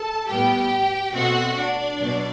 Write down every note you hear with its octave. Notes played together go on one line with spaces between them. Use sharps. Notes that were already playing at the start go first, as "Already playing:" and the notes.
Already playing: A4 A5
A2 G3 B3 G4 G5
B2 A3 C4 F#4 F#5
D4 D5
B2 F#3